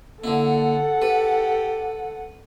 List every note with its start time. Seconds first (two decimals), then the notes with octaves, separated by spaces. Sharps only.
0.24 D3 A#3 E4 A4 F#5
1.02 G4 B4